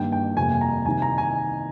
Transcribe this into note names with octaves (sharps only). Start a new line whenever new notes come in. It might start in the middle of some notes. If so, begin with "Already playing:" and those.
Already playing: G2 D#3 G3 A#3 G5
G5
F2 C3 G3 A#3 G#5
A#5
C2 C3 D#3 G#5
A#5
G#5